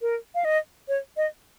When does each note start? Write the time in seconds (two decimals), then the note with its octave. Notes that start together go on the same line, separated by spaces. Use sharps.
0.01 A#4
0.35 F5
0.45 D#5
0.88 C#5
1.17 D#5